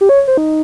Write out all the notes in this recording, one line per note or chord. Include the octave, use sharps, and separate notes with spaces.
G4
C#5
C5
D#4